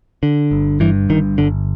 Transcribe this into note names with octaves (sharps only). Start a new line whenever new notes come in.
D3
G1
G2 E3
G1 D#3
G1 D3